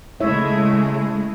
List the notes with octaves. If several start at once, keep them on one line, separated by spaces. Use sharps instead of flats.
C#3 G#3 A3 E4 C#5 E5